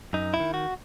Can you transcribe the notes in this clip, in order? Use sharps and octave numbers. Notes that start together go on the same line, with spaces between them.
F#2 D#4
E4
D#3
F#4